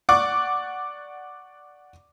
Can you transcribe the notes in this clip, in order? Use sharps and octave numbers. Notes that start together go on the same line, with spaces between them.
D5 F#5 C#6 D6